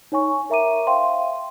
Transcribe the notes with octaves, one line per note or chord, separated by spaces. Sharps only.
D#4 C#5 G#5 C#6
A#4 E5 A#5 D6 D#7
C5 E5 F5 G5 C6